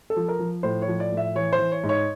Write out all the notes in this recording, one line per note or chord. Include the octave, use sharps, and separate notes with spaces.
A4
F3
A#4
F3
A2 C5
C#5
F3
D5
A2
E5
E3 C#5
C5
E3
C#5
G#2
C#5